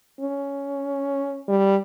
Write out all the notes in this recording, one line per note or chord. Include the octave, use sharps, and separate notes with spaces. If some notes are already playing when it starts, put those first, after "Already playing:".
C#4
G3